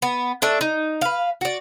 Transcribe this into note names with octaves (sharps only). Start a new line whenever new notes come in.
B3
A3 D4 E5
D#4
B4 F5
F#4 D5